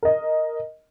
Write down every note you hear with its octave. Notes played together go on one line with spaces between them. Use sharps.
A#4 D#5